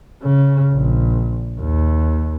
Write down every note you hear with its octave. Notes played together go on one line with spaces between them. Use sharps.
C#3
A#1
D#2